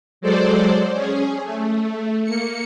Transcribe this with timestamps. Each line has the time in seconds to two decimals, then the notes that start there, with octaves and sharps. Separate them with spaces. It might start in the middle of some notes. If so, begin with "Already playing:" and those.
0.21 F#3 G#3 A4 C5 D5
0.94 C#4 G#4
1.43 A3
2.24 A#3 C#7